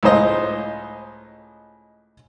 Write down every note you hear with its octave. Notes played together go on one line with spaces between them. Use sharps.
C#2 A2 D#4 C5 D#5